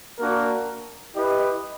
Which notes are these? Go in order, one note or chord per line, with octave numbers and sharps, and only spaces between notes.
A#3 D4 F#4 A#4
E4 G4 B4 D#5